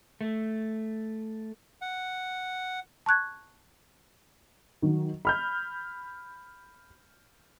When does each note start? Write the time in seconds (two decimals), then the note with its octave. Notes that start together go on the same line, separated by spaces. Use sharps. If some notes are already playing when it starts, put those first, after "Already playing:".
0.21 A3
1.82 F#5
3.06 A5 C#6 F#6 G#6
4.82 D#3 F#3
5.25 B5 F6 G6